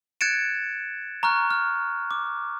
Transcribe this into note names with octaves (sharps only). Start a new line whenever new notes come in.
F#6 G#6 A6 C#7 D7 E7
A#5 C#6 F6 F#6
F6
D6